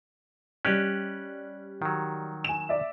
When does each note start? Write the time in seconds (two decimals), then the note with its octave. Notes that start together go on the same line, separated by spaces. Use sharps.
0.65 G3 C#4 G4 D#5 F#6
1.82 D#3 F#3
2.44 G#5 E7
2.69 D5 E5